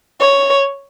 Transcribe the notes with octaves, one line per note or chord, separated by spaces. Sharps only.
C#5